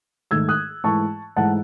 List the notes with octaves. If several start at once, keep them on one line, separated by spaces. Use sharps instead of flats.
G#2 D#3 A3 E6 G#6
D#6 F#6
G#2 E3 A3 A5 C#6
G#2 E3 A3 F#5 A5